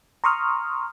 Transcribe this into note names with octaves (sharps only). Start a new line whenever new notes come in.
A#5 C6 C#6 D#6 F6